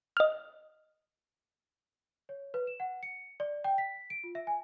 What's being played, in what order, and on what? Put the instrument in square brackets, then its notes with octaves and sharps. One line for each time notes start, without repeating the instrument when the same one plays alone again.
[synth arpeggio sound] D#5 F6
[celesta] C#5
B4
E7
F#5
C#7
D5
G5
B6
D7
F4
E5
G#5